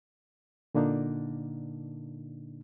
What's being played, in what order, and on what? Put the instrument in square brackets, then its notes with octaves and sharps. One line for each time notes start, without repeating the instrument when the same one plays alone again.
[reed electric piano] A#2 D3 A#3 D4 D#4